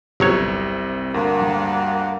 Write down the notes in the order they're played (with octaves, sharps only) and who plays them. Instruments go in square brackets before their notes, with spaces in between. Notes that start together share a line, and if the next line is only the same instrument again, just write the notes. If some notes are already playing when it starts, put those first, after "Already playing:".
[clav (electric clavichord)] G1 F#3 C#5 [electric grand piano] C2 C3
[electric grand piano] D2 [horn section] G2 A#3 F#5